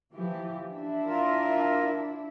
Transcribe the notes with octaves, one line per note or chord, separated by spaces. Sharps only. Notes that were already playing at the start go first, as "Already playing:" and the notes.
E3 F3 G4
D4 E4 E5
F4 A#4